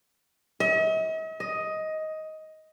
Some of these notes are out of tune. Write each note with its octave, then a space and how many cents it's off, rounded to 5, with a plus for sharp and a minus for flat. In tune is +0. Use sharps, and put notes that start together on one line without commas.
D#5 +45
D#5 +10